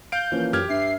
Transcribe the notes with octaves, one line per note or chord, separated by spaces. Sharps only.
F5 G6 D7
E3 F3 A#3 C#4
F#2 G4 F6 G#6
G2 E5 C7